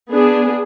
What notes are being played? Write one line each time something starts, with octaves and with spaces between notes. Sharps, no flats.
B3 D4 G#4